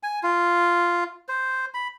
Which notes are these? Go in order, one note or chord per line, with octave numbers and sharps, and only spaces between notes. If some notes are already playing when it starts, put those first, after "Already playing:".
G#5
F4
C5
B5